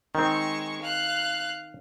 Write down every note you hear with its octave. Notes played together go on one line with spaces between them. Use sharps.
D#3 G#3 C4 C#6
F5 F#6